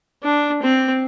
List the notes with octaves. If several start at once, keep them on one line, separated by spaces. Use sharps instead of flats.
D4
C4